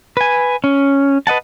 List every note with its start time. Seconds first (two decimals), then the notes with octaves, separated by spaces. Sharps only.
0.17 B4 G#5
0.64 C#4
1.27 B4 D#5 F#5 A5